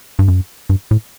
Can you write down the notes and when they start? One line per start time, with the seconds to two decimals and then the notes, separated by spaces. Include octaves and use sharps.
0.19 G2
0.28 F#2
0.69 G2
0.91 A2